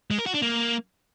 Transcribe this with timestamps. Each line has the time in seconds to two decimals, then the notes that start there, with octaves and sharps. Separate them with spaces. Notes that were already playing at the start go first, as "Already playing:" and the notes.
0.11 G#3
0.18 A#4
0.26 F#4
0.34 D4
0.42 A#3